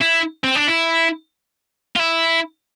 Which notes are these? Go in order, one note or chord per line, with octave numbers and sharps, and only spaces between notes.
E4
C4
D4
E4
F4
E4